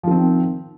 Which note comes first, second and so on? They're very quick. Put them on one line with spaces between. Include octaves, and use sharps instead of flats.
F3 D#3 C4